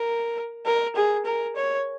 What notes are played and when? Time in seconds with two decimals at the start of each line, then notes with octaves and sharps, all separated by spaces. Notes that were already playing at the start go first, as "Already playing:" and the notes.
Already playing: A#4
0.66 A#4
0.96 G#4
1.25 A#4
1.56 C#5